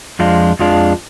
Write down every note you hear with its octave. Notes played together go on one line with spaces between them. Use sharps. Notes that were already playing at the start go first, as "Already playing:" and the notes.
F2 F3 G#3 D4 F4
F2 F3 G#3 D4 F4